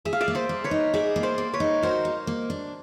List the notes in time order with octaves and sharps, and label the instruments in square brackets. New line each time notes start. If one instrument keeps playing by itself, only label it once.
[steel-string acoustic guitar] G#4 [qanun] E5
[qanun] F5
D5 E5
[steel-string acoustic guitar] A#3
[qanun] C5 D5
[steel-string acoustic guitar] A#3
[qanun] B4 C#5
[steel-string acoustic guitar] D#4
[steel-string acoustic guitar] G#4 [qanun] D5 E5
[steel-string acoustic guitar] A#3
[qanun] C5 D5
[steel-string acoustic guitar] A#3
[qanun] B4 C#5
[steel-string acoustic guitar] D#4
[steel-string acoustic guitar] F#4 [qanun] A#4 C5
[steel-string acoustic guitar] A#3
A#3
D4